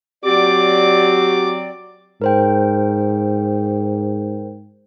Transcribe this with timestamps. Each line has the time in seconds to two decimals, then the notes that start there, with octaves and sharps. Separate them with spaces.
0.25 F#3 C4 F#4 G4 D5 D6
2.22 G#2 A#4 C5 G5